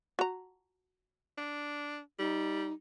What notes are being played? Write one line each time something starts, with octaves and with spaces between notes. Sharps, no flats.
F#4 A#5
D4
G3 D#4